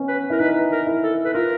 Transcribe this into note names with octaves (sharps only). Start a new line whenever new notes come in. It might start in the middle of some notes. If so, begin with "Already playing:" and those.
Already playing: B3 C#4
B4
E4 A#4
D#4 B4
A#4
E4
A4
B4
F4 A#4